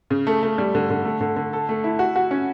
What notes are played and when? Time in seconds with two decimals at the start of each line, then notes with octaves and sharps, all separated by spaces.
0.10 C#3
0.27 A3
0.42 A3
0.58 G3
0.75 D3
0.90 D3
1.05 A3
1.21 D3
1.36 D3
1.53 A4
1.69 A3
1.84 E4
1.99 F#4
2.16 F#4
2.31 C#4